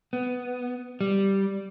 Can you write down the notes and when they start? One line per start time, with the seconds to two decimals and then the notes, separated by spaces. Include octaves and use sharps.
0.13 B3
1.01 G3